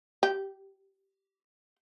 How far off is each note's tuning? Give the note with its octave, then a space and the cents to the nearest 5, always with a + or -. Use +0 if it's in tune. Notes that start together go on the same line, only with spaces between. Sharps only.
G4 -15